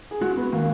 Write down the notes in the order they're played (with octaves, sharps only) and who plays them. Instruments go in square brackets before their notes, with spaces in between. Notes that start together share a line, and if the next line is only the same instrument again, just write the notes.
[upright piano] G#4
[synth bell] G#3 [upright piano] F#4
[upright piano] B3
[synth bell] D#3 [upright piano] A#3